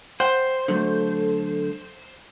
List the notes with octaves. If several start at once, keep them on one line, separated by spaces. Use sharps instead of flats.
C5 F#5 G5
D3 F#3 A3 A4